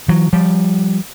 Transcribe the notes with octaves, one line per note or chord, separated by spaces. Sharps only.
E3 F#3
F3 G3